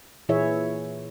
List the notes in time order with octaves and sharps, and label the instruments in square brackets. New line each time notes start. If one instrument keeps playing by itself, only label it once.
[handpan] A#2 E3 E4 G#4 C#5 E5